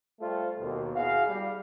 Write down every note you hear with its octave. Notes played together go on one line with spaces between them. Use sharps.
G3 A3 F4 A4 C5
D#2 B2
E4 F#4 G#4 F5
G3